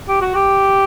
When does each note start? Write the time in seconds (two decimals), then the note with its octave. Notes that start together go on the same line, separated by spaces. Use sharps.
0.08 G4
0.21 F#4
0.35 G4